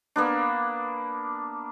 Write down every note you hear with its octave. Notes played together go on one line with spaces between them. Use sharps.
A#3 B3 D4